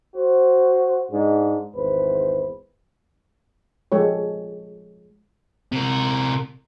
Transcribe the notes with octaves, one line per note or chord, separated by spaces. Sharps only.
F#4 C5
G#2 G#3 D4 D#4
G#1 E2 B4 C5
F3 G#3 G4 A4 C#5
C3 A#4